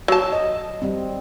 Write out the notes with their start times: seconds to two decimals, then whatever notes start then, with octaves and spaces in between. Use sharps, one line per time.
0.08 F#3 A5
0.32 D#5
0.82 G3 C4